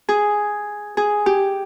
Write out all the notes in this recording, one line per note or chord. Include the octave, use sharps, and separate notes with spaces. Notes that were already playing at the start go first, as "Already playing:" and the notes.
G#4
G#4
G4